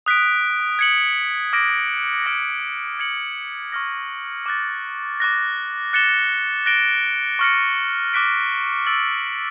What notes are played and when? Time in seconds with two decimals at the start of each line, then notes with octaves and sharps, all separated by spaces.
0.06 D#6 F#6 B6 D7
0.79 G#6 C#7 F#7
1.53 D6 F6 A#6 D7
2.26 D6 F6 A#6 D7
2.99 G#6 C#7 F#7
3.72 C#6 F6 A#6
4.46 D6 F#6 A6
5.20 D6 F#6 A#6
5.93 F#6 A6 C#7 E7 G7
6.66 F#6 A#6 D7 G7
7.39 C#6 F6 A#6 C#7
8.14 D6 F#6 B6 D7
8.87 E6 A6 D7 F#7